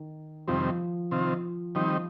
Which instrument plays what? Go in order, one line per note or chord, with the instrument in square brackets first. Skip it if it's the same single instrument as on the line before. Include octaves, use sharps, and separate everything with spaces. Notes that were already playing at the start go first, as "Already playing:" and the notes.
Already playing: [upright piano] D#3
[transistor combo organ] F2 C3 D#3 G3 C4 [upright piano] F3
[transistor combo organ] C3 D#3 C4 F4
[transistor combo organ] D#3 G3 C4 D#4 [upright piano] F3